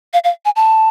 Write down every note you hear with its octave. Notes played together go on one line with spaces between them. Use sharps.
F5
F5
G#5
A5